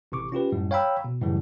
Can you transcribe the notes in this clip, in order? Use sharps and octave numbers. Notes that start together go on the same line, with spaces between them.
A1 C3 C#6 D6
C#4 F4 G4 B4
F#2 A2 G3
C#5 F5 G5 A#5 B5 E6
B2
F#2 A2 C#3 E3 G3